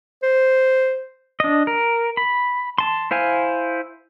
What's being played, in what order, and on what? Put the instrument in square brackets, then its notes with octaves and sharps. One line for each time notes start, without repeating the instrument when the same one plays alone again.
[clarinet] C5
[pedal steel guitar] D4 D#5
A#4
B5
A5 C6
E4 C5 F5 G#5